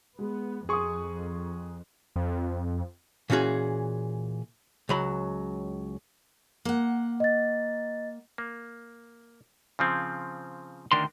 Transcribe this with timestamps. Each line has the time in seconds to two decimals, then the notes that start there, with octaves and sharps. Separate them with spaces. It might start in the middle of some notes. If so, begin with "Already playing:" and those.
0.19 G#3 B3
0.69 F2 G#4 C6 C#6 D#6
2.16 F2
3.30 A#2 E3 C#4 F#4 G#4
4.89 C#2 F#3 B5
6.65 A#3 F#5
7.20 D#5 A6
8.38 A#3
9.79 C#3 F3 C4
10.92 D2 D#3 D4 A#4 C6